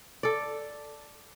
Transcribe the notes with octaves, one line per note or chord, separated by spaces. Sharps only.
A4 D5